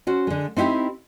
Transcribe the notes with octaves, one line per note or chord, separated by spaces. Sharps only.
C#4 F#4 C5
D3 G#3
C4 D#4 E4 F#4 G4